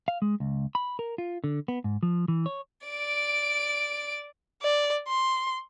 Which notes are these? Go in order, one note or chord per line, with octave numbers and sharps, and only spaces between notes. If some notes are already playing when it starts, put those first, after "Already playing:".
F5
G#3
C#2
B5
A#4
F4
D3
B3
G#2
F3
E3
C#5
D5 D7
D5
C6